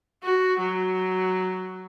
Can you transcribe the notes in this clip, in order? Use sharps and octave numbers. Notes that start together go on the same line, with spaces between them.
F#4
F#3